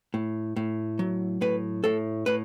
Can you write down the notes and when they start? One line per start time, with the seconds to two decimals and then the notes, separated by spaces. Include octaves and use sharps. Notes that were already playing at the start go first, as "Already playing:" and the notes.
0.14 A2
0.56 A2
0.99 F#3
1.41 A2 B4
1.84 A2 A4
2.26 A2 B4